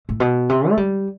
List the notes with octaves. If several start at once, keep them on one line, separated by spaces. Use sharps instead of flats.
A2
B2
C3
A3
G3